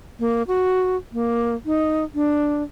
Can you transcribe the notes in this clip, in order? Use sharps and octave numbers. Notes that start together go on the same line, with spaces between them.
A#3
F#4
A#3
D#4
D4